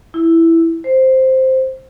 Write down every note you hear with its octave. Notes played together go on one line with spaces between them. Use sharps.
E4
C5